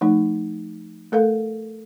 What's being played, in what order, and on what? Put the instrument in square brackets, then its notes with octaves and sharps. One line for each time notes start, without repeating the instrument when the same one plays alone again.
[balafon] F3 A3 D#4
A3 A4 A#4 F5